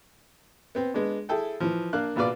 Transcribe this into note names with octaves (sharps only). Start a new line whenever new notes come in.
B3 C4
G#3 B3 D4
E4 G#4 A4 G5
E3 F3
A#3 D4 F5 F#6
A#1 B2 F4 B4 D5